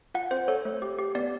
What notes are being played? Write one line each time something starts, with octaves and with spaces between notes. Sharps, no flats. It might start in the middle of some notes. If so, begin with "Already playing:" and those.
F4 F#5
C4 C5
A4 C#5
A3
G4
G4
B3 D5